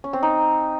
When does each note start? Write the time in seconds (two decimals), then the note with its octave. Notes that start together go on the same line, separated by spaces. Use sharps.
0.04 C#4
0.13 C4
0.23 D#4